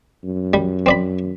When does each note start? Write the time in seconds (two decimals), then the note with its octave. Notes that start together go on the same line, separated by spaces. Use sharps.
0.24 F#2
0.54 G3
0.86 C4 D5 B5